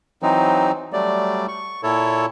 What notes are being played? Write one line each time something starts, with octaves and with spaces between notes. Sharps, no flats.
E3 F#3 C4 D#4
F#3 G3 A3 D5
C#6
A#2 E4 A4 C#5